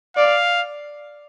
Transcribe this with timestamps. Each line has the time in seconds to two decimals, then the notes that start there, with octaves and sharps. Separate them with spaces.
0.16 D5 F5